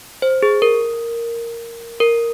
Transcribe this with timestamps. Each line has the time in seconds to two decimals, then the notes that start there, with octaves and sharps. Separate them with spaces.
0.22 C5
0.43 G#4
0.62 A#4
2.00 A#4